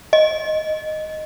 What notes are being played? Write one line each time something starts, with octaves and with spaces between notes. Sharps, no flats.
D#5